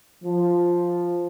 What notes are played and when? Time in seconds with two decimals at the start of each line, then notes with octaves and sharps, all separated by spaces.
0.23 F3